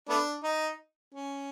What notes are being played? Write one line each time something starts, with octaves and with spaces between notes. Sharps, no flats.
A3 B3 D4
D#4
C#4